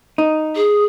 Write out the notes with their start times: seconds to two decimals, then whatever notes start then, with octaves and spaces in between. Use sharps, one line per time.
0.18 D#4
0.55 G#4